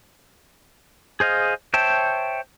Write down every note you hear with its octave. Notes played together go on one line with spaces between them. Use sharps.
G#4 C5 D#5 F5
C5 C#5 E5 G5 A5